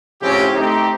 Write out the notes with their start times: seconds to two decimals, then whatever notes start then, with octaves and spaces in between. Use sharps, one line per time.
0.22 A2 C#3 F3 C4 C#4 G4
0.54 A3 C4 D#4 G4